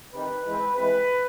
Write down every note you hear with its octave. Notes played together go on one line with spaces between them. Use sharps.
C3 D#3 G3 B4
E3 G#3 C4
C3 E3 G#3 B4